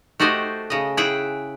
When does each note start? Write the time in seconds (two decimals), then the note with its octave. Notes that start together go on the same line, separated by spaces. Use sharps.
0.20 A3 F#4 G4 C5 D#5
0.70 C#3 D#5
0.97 E4 G#4 F#5 G5